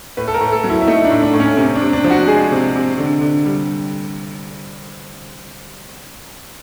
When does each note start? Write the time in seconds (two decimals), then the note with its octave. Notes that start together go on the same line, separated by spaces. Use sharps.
0.17 A2 B4
0.28 A4
0.34 A#4
0.40 A2
0.52 A4
0.64 F#3
0.70 E4
0.82 E4
0.87 A3 D#4
1.04 D4
1.10 A2
1.22 D4
1.34 A2
1.40 C#4
1.57 C3 C#4
1.75 D4
1.81 C3
1.93 D4
2.04 F3
2.10 F#4
2.27 G#3 G#4
2.52 C3
2.75 C3
2.98 D3
3.22 D3
3.46 G3